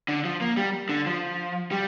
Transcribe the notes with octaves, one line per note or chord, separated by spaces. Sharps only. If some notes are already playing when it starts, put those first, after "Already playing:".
D3
F3
A#3
G3
D3
F3
G3